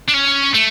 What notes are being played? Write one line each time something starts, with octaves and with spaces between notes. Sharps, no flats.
D4
C#4
A3